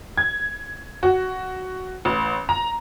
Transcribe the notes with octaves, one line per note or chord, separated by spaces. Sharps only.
G#6
F#4
A1
A#5